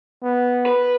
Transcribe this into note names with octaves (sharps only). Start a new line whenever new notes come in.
B3
B4